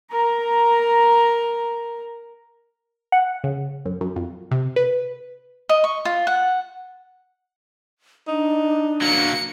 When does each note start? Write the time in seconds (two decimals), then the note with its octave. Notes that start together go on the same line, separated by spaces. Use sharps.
0.11 A#4 A#5
3.12 F#5
3.44 C#3
3.85 F#2
4.01 F#2
4.16 F2
4.51 C3
4.76 B4
5.69 D#5
5.84 C#6
6.05 F4
6.27 F#5
8.28 D4 D#4
9.02 F#3 A#3 C#7